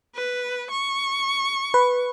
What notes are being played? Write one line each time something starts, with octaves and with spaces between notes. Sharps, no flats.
B4
C#6
B4